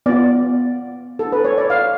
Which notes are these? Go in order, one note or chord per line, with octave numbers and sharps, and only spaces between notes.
B3 F4 D5
A4
B4
C#5
D5
F5